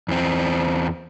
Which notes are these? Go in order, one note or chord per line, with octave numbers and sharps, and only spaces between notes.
E2 C4